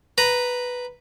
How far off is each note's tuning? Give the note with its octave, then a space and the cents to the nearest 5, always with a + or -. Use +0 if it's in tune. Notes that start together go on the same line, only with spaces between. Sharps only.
B4 +0 A#5 +0